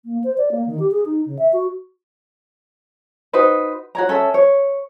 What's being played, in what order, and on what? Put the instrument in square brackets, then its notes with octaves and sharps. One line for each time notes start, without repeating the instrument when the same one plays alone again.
[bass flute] A#3
C5
D5
A#3
D#3
G4
G#4
D#4
C#3
E5
F#4
[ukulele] D#4 F#4 B4 C5
F#4 C#5 A#5
C#4 A4 E5
C#5